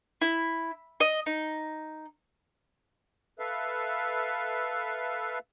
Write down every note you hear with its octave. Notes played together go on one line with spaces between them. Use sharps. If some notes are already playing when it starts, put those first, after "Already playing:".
E4
D#5
D#4
A4 B4 E5 F5